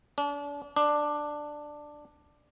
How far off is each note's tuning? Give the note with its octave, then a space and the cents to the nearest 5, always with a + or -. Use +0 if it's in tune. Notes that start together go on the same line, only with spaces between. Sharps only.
D4 -35
D4 +10